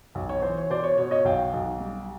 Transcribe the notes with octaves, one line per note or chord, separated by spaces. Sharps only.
B1
C#5
E3 C5
C#5
B2 C5 D5
C#5
B2 C#5
C#5 D#5
B1 F5 G5
B1
G3